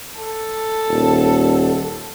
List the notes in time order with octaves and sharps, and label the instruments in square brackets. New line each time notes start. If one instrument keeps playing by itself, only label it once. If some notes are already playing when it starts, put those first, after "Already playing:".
[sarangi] A4
[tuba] D#1